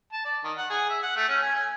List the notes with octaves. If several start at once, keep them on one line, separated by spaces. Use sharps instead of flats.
A5
D5
D#3
F#5
G#4
E5
F#5
A3
C#4
G#5
G#5